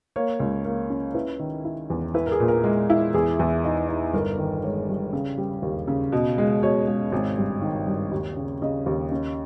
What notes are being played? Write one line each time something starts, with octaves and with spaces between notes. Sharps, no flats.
A#3 C#5
C#2
A#3
C#4
E4 B4
D#3
E4
E2
E4 B4
A#4
G#4
A#2
A#4
G#3
E4
E2 G#4
E2
D#4
D#4
G1 A#4
D#3
G#3 C#5
G2
C#3
G3
D#2
C#3
B2
G#3
B2 C#5
G#3
G#1
G2
D#3
G2
D#2
C#3
C#3 D#5
D#2
C#4